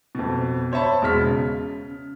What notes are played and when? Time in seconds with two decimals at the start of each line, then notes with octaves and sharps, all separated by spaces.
0.15 F2 B2
0.72 C5 C#5 E5 A5 B5
1.02 E1 B2 G#3 F6 B6
1.22 C#3